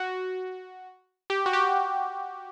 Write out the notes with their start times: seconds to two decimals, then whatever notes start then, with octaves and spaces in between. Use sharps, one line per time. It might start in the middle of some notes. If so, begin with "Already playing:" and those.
Already playing: F#4
1.30 G4
1.46 F#4
1.53 G4